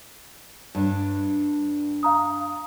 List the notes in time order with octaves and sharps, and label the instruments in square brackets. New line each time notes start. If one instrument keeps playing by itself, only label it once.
[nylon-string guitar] G2 D4
[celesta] F5 A#5 D#6